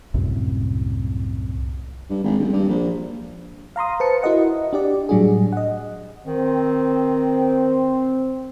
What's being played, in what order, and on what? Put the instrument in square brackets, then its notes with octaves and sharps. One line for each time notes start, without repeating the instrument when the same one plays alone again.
[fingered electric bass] C2 F#2 A2 C3
[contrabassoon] G2
G#1
D#1
G2
A#1
[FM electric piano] F5 A#5 C6 D#6
B4 C5 A5 C#7
E4 F#4 A#4 D#5 F#5
D4 G4 D5
A2 F#3 G3 D4 F#4 G#4
D#5 F#5
[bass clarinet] D#3 [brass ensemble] C4